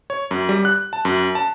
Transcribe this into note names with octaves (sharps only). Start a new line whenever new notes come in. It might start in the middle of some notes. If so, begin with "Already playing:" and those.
C#5
F#2
G3
F#6
A5
F#2
A5